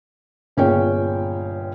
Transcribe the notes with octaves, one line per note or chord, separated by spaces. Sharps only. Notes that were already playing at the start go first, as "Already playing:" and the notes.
G1 A#2 C#4 G#4 C#5 G5